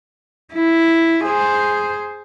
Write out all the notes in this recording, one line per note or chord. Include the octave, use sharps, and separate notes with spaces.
E4
G#4 C5